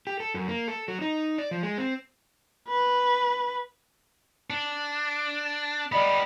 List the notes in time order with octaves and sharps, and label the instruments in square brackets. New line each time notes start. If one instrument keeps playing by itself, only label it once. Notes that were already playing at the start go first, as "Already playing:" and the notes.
[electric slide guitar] G4
A4
F#2
A#3
A4
F#3
D#4
D5
F3
G#3
C4
[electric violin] B4
[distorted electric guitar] D4
[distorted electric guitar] G3 B3 [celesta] D5 D#5 B5